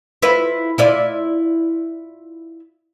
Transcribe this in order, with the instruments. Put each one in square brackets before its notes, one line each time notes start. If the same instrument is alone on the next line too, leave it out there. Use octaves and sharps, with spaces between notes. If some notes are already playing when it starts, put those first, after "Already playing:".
[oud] E4 F4 B4
E4 F4 D5